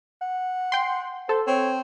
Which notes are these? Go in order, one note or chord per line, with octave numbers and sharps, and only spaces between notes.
F#5
G5 C6
A4 C5
C4 C#5